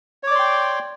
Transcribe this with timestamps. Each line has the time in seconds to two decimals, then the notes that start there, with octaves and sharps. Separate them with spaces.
0.23 C#5
0.27 D6
0.31 D5
0.35 C6
0.39 G5